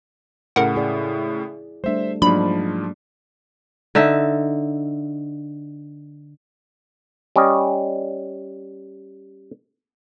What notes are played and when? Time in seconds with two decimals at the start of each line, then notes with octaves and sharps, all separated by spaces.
0.56 A2 C#3 A#4 F#5
0.75 E4 G#4 D5
1.84 G3 A3 D4 C5 E5
2.22 G#2 F3 F#3 A#3 D4 B5
3.95 D3 D#4 E5
7.36 G3 C#4 D#5